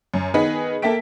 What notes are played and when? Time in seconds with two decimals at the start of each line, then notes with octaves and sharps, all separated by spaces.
0.14 F#2
0.34 D#3 B3 G#4 B4 D#5
0.82 A#3 A4 E5 G5 B6 D7